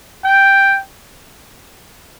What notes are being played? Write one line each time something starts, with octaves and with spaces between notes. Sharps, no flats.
G5